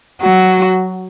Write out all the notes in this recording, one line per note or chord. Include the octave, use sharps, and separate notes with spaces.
F#3 F#4